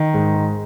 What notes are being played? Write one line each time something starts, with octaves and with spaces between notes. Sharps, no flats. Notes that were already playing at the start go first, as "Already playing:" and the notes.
Already playing: D#3
G#2
G#3